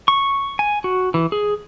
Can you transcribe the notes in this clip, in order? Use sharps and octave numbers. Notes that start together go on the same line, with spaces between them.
C#6
G#5
F#4
E3
G#4